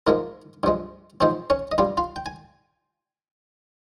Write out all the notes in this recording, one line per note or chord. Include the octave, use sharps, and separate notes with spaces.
G#2 F3 G#3 A#3 A#4
G2 F3 G#3
G#2 F3 G#3 C4 C5
C#4 C#5
D#5
G2 G3 F4 F5
F4 F5
G5
G#5